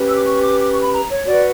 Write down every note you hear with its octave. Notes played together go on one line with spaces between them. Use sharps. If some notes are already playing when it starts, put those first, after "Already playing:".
Already playing: C#4 G4 B4
E6
D6
C#6
D6
D6
C#6
B5
A#5
C#5
F#4 B4 D5